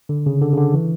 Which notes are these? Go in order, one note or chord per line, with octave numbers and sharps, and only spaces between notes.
D3
C#3
D3
C#3
D3
E3